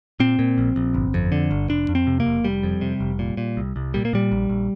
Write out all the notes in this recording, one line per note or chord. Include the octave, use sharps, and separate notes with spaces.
A#2 C4
A#2
A#1
A#1
G1
F2
D3
G1
F1 D4
F2
C4
C3
A#3
F1
F1 G3
F2
C3
F1
A#2
A#2
C2
C2
A#2 G3
A#3
A#2 G3
A#1
A#1